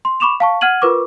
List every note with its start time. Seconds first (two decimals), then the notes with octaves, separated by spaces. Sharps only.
0.05 C6
0.20 B5 C#6 D6 E7 F7
0.40 F5 A5 C#6
0.61 F#5 F6 G#6 D#7 F#7
0.82 F4 A#4 B4 C#6 D6